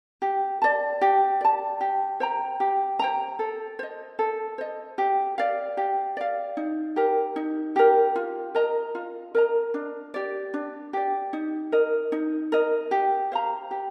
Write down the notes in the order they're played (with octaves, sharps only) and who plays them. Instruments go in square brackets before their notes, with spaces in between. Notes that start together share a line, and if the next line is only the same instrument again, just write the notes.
[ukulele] G4
D5 A5
G4
D5 A5
G4
C5 G5 A#5
G4
C5 G5 A#5
A4
C5 D#5
A4
C5 D#5
G4
D5 F5
G4
D5 F5
D#4
G4 A#4
D#4
G4 A#4
F4
A#4 D#5 A#5
F4
A#4 D#5 A#5
D4
G4 D5
D4
G4 D5
D#4
A#4 D#5
D#4
A#4 D#5
G4
C5 F5 A#5
G4